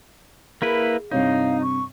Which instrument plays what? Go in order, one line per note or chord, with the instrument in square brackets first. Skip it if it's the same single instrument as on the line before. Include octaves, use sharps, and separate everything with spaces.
[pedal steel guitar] A#3 E4 B4 [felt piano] G#4 [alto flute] A#4
[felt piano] G2 C3 C#5 [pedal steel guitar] D#4 [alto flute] F5
[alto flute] C#6